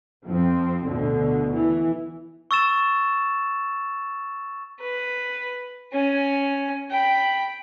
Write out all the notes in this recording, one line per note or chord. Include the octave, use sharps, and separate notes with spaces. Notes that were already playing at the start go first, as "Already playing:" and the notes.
F2 F3 C4
D2 B2 D3
E3
C#6 E6 A6 E7
B4
C#4 G#5
G5 B5